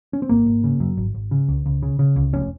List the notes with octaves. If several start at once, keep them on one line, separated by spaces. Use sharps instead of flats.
C#4
C4
G#1 A#3
G#1
C#3
F#2
G#1
G#1
C#3
C#2
C#2
C#3
C#3
C#2
F1 C#4